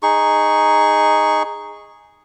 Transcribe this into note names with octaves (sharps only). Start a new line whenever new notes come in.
D#4 G#4 C#6